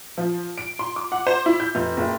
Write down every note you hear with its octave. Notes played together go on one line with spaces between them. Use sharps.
F3
D7
C6
D6
F#5
C5
E4
G6
F1
F#1